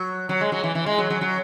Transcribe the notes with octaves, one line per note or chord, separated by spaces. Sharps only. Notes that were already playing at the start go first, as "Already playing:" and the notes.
Already playing: F#3
F#3
G#3
F#3
E3
E3
G#3
F#3
F#3
F#3